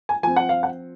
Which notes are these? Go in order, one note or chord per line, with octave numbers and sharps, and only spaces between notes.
G#5
F3 C4 G#5
F#5
F5
F#5